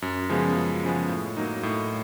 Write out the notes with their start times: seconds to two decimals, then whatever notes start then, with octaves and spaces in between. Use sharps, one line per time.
0.02 F#2
0.29 C#3 F3 G#3 B3
0.55 F#2
0.83 C#3 F3 G#3 B3
1.09 A2
1.37 F#3 A#3 D#4
1.63 A2